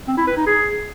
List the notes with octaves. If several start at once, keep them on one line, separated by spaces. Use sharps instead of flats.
C4
E4
B4
D#4
G#4